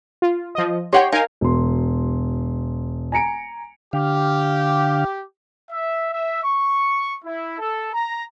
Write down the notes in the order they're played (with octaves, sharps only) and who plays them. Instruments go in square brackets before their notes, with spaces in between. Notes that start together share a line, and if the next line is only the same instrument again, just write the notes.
[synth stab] F4
F3 D#5
[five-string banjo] D#4 F#5 G5 [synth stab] G4 C#5 C6
[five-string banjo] D#4 [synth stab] A#4 F5 G#5
[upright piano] E1 C6
G#5 A#5 C#7 D7
[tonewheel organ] D3 F5 [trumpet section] G4
[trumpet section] E5
E5
C#6
E4
A4
A#5